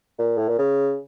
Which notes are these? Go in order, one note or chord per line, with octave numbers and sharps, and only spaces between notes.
A#2
A2
A#2
C#3